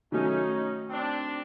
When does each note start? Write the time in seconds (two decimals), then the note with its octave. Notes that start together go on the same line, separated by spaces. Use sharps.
0.12 D#3 F#3 A3 C#4 D#4
0.90 C4 D4